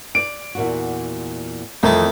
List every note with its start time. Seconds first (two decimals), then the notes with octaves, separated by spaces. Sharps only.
0.15 D5 D7
0.55 E2 A#2 F#4
1.83 F2 D#3 E3 A3